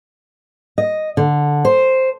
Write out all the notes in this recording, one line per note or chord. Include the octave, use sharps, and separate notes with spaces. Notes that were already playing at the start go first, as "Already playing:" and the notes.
D#5
D3
C5